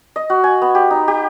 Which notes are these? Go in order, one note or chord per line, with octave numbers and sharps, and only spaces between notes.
D#5
F#4
G#5
B3
G4
D#4
G4